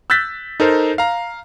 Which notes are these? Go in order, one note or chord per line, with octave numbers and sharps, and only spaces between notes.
E6 F#6 G6 A6 B6
D#4 A4 A#4 C5
F5 A#5